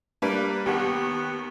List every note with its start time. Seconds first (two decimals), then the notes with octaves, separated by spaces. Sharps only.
0.22 G3 A#3 D4 B4
0.66 D#2 D#3 B3 G4 F#5